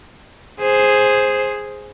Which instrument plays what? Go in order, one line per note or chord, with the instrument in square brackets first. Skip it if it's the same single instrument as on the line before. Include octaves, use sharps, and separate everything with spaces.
[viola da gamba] G#4 C5